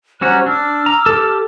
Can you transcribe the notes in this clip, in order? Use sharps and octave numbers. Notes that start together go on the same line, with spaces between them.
G3 C#4 F#4 C5 A#5 F#6
D4 D6 E6 F6
A#5
G4 A4